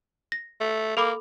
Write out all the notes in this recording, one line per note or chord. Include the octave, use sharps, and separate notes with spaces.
A#6
A3
A#3 A4 B5 D6